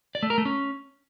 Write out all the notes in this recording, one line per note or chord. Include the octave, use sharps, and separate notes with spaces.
D5
A3
A#4
A3
C#4